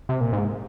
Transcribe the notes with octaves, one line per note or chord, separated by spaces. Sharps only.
C3
A#2
G#2